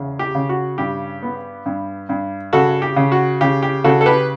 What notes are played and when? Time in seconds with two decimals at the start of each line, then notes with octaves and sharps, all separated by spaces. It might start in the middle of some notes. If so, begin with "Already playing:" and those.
Already playing: E2 C#3
0.19 G4
0.35 C#3
0.49 F#4
0.78 G2 G4
1.23 B3
1.66 G2
2.09 G2
2.53 C#3 F#4 A4
2.82 G4
2.96 C#3
3.12 F#4
3.41 C#3 G4
3.63 G4
3.84 C#3 F#4 A4
4.01 A4
4.06 G4 B4